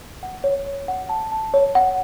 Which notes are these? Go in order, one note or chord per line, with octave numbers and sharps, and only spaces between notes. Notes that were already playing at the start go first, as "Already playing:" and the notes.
F#5
C#5
C#5
F#5
A5
A5
C#5
F#5